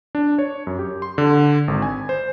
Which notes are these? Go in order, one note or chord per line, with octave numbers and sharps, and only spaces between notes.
D4
C#5
F#2
G4
C6
D3
G#1
G#5
C5